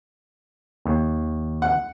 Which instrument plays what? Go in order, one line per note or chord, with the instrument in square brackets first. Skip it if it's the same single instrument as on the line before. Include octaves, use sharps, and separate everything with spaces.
[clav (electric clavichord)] D#2
[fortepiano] F#5